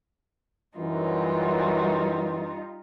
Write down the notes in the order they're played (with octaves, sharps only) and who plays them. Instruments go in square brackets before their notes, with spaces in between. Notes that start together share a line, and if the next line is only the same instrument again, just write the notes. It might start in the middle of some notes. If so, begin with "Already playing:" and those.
[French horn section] F#2 E3 [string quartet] G3 D#4 F4